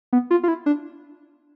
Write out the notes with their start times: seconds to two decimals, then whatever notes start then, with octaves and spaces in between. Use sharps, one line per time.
0.13 B3
0.31 F4
0.43 F4
0.48 E4
0.66 D4